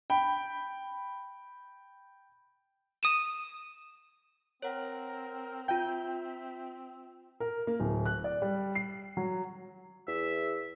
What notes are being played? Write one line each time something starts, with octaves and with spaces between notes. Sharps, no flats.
G5 B5
D#6 D#7 E7
C4 A#4 C#5 F#5
F4 E5 G5 G6
A#4
A#3
D1
F#6
D5
G3
C7
F#3
E2 E5